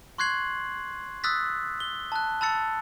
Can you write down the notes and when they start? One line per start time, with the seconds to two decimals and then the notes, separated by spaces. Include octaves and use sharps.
0.18 C6 C#6 F#6 G#6 C7 F#7
1.24 D#6 E6 F#6 A6 B6
1.80 G7
2.12 A5 F#6
2.41 A5 B5 E6 A6 C#7